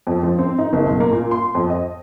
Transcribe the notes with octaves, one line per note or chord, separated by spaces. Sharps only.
F2
F3
C4
D#4
F#1
B1
A#3
A#2
C6
F2
D#5